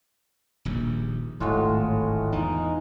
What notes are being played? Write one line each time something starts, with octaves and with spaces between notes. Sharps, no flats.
D#1 A#1 D#2
D1 G#1 A2 G#3 F4 F#4
A2
E2 E3 D#4